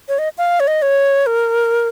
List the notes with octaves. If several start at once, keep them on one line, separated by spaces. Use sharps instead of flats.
C#5
D#5
F5
C#5
D#5
C#5
A#4